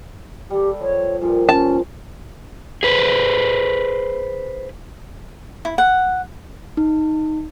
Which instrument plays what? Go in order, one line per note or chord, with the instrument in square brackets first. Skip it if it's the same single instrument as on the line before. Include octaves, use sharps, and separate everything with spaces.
[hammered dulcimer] G3 A4 [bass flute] G4
[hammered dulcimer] F3 [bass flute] C#5
[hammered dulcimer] G2 A#2 F3 [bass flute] F4
[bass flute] C#4 [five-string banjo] A5
[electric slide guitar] G#4 B4 C5
[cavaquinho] E4
F#5
[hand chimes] D#4